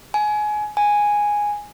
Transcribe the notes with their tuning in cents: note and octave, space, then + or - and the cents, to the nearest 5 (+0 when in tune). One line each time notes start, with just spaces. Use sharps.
G#5 +20
G#5 -5